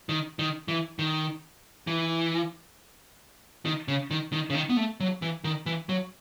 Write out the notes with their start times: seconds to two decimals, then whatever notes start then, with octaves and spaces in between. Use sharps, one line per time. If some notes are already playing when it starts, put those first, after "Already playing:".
0.09 D#3
0.39 D#3
0.68 E3
0.99 D#3
1.87 E3
3.65 D#3
3.88 C#3
4.11 D#3
4.32 D#3
4.50 C#3
4.55 D#3
4.69 B3
4.77 A3
5.00 F#3
5.22 E3
5.44 D#3
5.66 E3
5.89 F#3